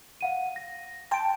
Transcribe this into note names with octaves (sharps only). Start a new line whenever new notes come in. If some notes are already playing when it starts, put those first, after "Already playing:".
F5 F#5 D#7
A#6
G5 A5 C6 D7